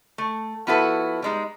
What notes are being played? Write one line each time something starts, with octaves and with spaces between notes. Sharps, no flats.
A3
F3 B3 E4 F#4 A4 B4
G3 G#3 D#4